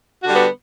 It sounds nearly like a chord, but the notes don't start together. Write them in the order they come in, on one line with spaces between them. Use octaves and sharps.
F#4 D3 G3 B3